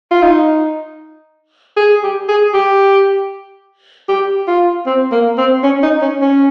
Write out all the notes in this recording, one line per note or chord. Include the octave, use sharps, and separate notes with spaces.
F4
D#4
G#4
G4
G#4
G4
G4
F4
C4
A#3
C4
C#4
D#4
C#4
C#4